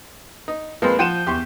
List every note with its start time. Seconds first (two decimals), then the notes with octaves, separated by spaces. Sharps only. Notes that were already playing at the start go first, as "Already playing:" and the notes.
0.48 D#4
0.82 F3 G#3 A#3 C4 B4
0.99 F3 C5 F#5 G5 G6 D#7 E7
1.27 E2 G4 C6 C#6